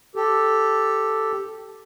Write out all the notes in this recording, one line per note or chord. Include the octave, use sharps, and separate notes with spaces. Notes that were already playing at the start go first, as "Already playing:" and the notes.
G4 A4